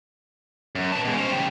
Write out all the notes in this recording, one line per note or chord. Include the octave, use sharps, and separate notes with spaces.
F#2
B4 A5
B2 G#3
C#4 C5
C#3 G3